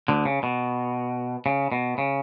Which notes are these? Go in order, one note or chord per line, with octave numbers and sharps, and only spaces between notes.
D2 D3
C#3
B2
C#3
B2
C#3